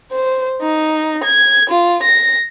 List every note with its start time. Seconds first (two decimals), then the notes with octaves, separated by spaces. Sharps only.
0.12 C5
0.62 D#4
1.24 G#6
1.70 F4
2.03 A#6